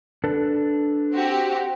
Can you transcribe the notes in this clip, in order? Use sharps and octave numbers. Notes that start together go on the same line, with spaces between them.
D4 A4 B4
C4 F#4 G4